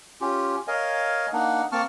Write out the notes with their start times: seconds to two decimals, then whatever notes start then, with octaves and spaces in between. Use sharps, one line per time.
0.21 C#4 F4 G4
0.68 A#4 C#5 D#5 F5 G#5
1.33 A#3 D4 D#4 F#5
1.72 A#3 C4 A5 C#6 F6